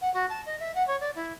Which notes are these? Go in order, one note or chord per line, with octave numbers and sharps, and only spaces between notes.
F#5
F#4
A5
D#5
E5
F#5
C#5
D5
E4